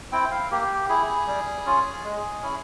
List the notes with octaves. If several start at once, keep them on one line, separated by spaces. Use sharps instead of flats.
C4 E4 G5
F5
A#3 G4
E4 G#4
G3
C#4 F4
G#3
C#4 E4